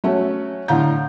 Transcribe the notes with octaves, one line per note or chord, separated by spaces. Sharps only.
F#3 A3 C#4
A2 D3 F5 A#5 G6